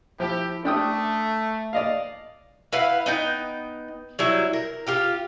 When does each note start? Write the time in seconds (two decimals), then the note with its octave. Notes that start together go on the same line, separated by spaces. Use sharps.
0.20 F3 E4 G4
0.65 A3 D4 G5 D#6
1.73 D5 D#5 F5
2.73 E4 B4 F5 F#5
3.06 B3 D#4 G5
4.19 F#3 G3 E4
4.53 A#4
4.87 F4 G4 F5